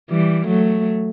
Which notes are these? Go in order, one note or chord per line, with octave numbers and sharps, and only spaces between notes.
E3 G3
F#3 A3